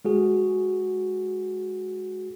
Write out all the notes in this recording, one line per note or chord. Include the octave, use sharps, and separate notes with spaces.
G#3 F#4 G#4